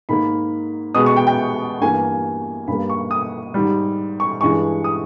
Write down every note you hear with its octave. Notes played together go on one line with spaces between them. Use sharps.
G#2 D#3 A#3 B5
B2 G#3 B3 D#6
C#6
G5
G5
G2 E3 A#3 G#5
G#5
G2 G3 A#3 B5
C#6
D#6
G#2 D#3 G3
C#6
G2 E3 G#3 C#6
D#6